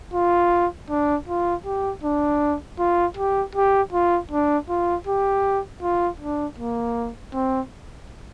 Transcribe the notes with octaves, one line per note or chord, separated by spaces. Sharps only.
F4
D4
F4
G4
D4
F4
G4
G4
F4
D4
F4
G4
F4
D4
A#3
C4